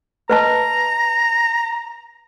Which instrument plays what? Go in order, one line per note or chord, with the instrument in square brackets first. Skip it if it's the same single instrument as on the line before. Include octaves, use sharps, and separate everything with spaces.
[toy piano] B4 D#5 A5 [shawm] A#5